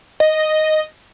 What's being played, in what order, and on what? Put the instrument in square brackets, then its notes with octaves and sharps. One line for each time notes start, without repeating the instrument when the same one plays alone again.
[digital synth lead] D#5